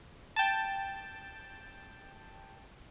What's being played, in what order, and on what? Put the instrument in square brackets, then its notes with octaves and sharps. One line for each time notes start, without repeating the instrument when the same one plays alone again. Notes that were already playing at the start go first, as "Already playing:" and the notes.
[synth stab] G5 A5